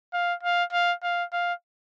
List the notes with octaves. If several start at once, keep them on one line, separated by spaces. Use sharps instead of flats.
F5
F5
F5
F5
F5